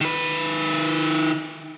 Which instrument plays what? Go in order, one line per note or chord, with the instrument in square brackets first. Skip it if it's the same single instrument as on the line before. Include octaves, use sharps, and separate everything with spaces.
[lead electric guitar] D#3 B4